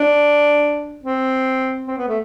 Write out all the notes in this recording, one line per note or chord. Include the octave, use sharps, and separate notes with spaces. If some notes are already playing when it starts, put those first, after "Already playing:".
Already playing: D4
C4
C4
B3
A3